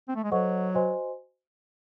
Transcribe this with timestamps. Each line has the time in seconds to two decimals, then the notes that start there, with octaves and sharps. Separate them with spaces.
0.08 C4
0.16 A3
0.24 G#3
0.31 F#3 A4 C5 D#5 F#5 C#6
0.74 F#4 C5 D#5 G#5 C6